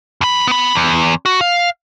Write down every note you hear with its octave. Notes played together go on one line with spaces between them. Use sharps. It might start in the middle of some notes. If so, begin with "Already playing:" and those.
F2 B5
B3 B5
E2
F#4
F5